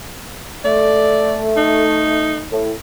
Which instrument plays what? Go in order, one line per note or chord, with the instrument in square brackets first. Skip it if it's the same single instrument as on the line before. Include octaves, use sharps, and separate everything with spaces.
[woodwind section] A3 [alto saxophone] D5
[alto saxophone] D#4
[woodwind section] A2